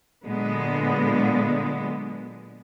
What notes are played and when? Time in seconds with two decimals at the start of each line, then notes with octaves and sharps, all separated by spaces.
0.25 A#2 D3 F#3 G#3 B3